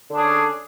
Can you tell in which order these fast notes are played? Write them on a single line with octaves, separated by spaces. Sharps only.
D3 D4 G#4 C#4